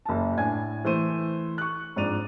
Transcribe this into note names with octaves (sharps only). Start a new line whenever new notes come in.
F#1 A5
A2 D4 G#5 G#6
E3 A3 C5 D#7
C#6 F#6
F2 G#2 D4 D5 D#7 F7